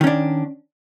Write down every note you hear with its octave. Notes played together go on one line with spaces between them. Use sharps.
D#3 C#4 D4